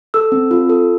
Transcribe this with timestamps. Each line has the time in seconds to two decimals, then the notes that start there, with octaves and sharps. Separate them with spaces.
0.14 A4 E6
0.32 C4
0.51 F4
0.69 A4